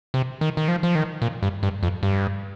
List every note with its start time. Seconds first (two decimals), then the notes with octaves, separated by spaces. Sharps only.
0.14 C3
0.41 D#3
0.57 D#3
0.68 F3
0.83 F3
0.95 D#3
1.22 A#2
1.43 G2
1.63 G2
1.83 F2
2.03 G2